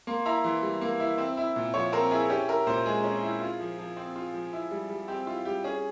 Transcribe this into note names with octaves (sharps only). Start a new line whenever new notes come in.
A#3 C6
E4 A#5
E3 C6
G3
A#3
E4
C4
E4
A#2
F3 C#5
C4 A#4
E4 G#4
C#4 G4
E4 A#4
A#2 C5
G#3 G#4
C#4
E4
F4
F3
F3
C4
F4
F3
E4
G3
G3
C4 G4
E4 F4
G3 G4
C#4 G#4